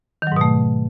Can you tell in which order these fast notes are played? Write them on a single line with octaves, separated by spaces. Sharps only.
D#3 F#3 G#2 B2 A3